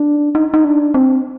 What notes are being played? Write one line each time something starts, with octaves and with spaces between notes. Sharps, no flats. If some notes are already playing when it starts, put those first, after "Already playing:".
Already playing: D4
D#4
D#4
D4
C4